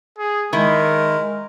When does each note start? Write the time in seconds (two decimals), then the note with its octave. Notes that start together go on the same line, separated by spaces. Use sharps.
0.18 G#4
0.53 D#3 G#3 E4 A#4